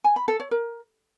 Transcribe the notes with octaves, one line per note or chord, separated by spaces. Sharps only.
G#5
B5
A4
C#5
A#4